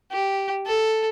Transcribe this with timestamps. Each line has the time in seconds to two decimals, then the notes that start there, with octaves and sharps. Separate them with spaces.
0.12 G4
0.67 A4